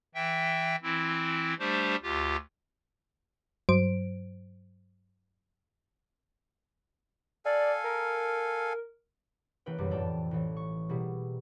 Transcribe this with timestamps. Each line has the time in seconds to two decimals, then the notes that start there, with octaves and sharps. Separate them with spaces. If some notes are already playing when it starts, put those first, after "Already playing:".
0.15 E3 E5 G5
0.83 E3 C4 E4
1.59 G3 A3 D4 G4 C5
2.03 D2 F4 G4
3.69 G2 F#3 C5 D7
7.45 A4 D5 F5 G#5
7.84 A#4
9.66 E3 A#3 C#4 B4 G5
9.78 F#1 B1 F#2 G3 D5
9.91 F2 A2 E3 D5 G5 A5
10.31 A1 E3
10.56 C#6
10.89 B2 G3 A#3 E4 G#4